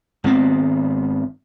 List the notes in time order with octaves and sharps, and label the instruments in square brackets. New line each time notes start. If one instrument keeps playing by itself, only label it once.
[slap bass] G#1 D#3 B3 C4